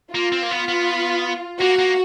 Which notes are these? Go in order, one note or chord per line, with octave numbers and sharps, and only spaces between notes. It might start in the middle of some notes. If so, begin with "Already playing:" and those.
A#3 F4
C4
A#3
B3
B3
A#3 F#4
A#3